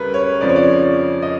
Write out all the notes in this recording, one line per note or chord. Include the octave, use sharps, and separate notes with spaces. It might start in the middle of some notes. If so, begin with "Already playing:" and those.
Already playing: D2 C#3 G3 A#4 B4
C#5
F2 C#3 F3 D5
C#5
D5
D#5